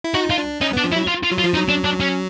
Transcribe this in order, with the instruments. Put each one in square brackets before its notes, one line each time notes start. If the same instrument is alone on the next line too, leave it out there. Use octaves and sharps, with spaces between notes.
[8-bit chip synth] E4
[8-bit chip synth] D#4 [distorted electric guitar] F#4
[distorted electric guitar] F4
[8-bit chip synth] D4
[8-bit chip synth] C#4 [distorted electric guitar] D#4
[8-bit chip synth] B3 [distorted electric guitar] D4
[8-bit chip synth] F3
[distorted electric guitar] E4
[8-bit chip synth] F#3
[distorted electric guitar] F4
F4
[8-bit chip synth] F#3
[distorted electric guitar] F4
[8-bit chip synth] F3
[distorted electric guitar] D#4
[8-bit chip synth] F#3
[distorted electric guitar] D4
D4
C#4